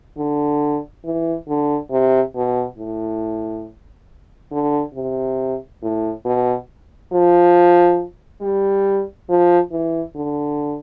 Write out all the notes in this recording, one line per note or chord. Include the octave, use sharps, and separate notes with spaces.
D3
E3
D3
C3
B2
A2
D3
C3
A2
B2
F3
G3
F3
E3
D3